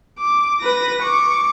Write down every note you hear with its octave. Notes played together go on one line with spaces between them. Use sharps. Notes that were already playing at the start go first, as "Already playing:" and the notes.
D6
B4 A#6
C#6 D6